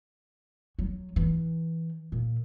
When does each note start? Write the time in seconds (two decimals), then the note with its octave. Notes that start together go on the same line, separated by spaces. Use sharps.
0.79 F#3
1.16 E3
2.12 A#2